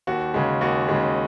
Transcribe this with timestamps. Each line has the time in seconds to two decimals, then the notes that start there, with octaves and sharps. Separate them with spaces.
0.07 D#2 F#4
0.34 C#3 G#3
0.61 D#2 F#4
0.89 C#3 G#3